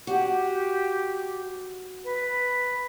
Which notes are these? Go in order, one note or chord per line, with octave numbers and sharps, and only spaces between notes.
F#4 G4
B4